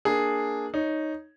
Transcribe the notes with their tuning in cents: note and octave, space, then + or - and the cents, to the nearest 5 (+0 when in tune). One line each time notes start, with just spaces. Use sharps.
A#3 +0 D4 +0 G#4 +0
D#4 +0 C#5 +0